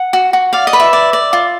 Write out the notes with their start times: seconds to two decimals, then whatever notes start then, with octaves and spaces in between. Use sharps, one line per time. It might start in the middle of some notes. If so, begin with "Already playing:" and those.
Already playing: F#5
0.13 F#4
0.33 F#4
0.53 D5 F5
0.67 D#5
0.73 B4
0.80 E5
0.93 D5
1.13 D5
1.33 F4